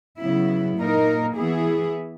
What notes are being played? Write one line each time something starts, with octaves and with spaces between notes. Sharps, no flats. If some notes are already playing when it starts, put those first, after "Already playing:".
C#3 F#3 B3 E4
A#2 A#3 D#4 A#4
E3 B3 E4 G#4